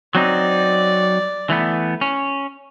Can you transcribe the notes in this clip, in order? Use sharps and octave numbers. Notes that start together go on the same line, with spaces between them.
F#3 C4 D#4 D5
E3 A3 B3
C#4